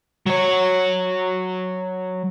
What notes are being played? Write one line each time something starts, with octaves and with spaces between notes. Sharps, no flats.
F#3 C#5